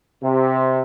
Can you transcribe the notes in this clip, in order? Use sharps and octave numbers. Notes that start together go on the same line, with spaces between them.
C3